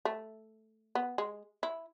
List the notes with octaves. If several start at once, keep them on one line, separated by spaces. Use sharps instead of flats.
A3
B3
G#3
E4